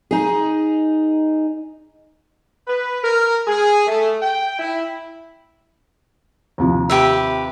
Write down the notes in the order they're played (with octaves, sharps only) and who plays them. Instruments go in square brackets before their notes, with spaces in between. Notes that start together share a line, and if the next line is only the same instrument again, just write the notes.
[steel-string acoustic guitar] D#4 G#4
[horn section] B4
A#4
G#4
A3
G5
E4
[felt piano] D#2 C3 F3
[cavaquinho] G4 B4 E5